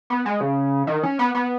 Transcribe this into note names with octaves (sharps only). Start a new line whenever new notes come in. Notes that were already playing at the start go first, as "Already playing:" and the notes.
B3
G#3
C#3
D#3
C#4
B3
B3